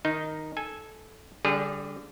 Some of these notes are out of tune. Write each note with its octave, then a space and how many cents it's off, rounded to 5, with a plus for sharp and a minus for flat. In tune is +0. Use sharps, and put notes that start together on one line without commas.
D#3 +0 D#4 +0
A4 -15 G#5 +0
D3 -30 G3 +5 G#4 -25